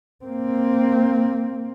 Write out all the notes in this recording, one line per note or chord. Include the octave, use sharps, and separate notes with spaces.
A#3 C4